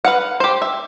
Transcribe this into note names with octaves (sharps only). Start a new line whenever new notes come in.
B4 F5 F#5
G4 C5
E5